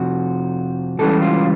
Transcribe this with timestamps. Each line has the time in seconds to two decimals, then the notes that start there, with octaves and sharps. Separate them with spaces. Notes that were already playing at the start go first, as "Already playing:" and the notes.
Already playing: F2 C3 F3 F#4
0.99 C#2 C#3 E3 G3 A4
1.22 F4